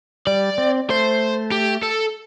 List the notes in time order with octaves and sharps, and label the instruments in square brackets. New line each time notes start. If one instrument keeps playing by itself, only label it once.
[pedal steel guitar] G3 [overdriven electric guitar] D5
[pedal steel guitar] C4
[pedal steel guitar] A3 [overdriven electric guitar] C5
[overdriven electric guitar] G4
A4